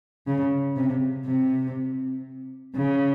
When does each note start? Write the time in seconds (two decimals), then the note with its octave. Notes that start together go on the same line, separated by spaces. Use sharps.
0.27 C#3
0.76 C3
1.26 C3
2.76 C#3